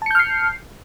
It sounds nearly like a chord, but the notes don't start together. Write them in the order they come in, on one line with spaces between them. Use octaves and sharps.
A5 C#7 G6 F6 C7